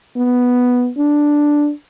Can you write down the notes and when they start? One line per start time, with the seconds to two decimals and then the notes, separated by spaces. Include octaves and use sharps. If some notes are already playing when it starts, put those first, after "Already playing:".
0.17 B3
0.98 D4